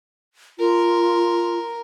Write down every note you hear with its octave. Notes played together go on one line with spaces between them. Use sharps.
F4 A#4